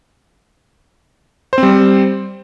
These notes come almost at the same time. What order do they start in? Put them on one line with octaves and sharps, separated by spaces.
C5 C4 G3